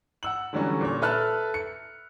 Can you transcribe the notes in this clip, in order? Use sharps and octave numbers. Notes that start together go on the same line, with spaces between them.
F#5 E6 F#7
D3 E3 F#3 G3 C#4
A#2 C#5
A4 B4 E5 A5 F6 F#6
C#7